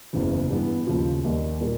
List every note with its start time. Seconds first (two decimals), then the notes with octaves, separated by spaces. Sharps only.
0.13 F#1 E2 C#3 E3
0.50 G2 E3 G3 B3
0.87 D#2 C#3 F3
1.24 D#2 D#3 G3
1.61 A#2 G3 A#3